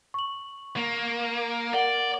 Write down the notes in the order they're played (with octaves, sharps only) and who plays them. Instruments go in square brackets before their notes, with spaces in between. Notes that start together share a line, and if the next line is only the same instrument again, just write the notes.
[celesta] C#6 F#7
[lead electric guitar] A#3
[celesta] A#4 F#5 G7 [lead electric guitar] D5